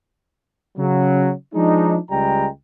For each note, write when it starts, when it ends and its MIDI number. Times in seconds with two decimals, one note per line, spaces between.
0.78 1.32 49
0.78 1.32 54
1.54 1.97 53
1.54 1.97 56
1.54 1.97 62
1.54 1.97 63
2.10 2.47 37
2.10 2.47 55
2.10 2.47 56
2.10 2.47 79
2.10 2.47 82